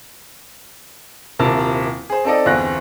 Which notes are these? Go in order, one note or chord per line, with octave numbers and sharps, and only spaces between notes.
D#1 C3 E4 A#4 A5 F6
G#4 C5
C4 D#4 A4 D5 D#5
G1 E2 C4 F#6 A#6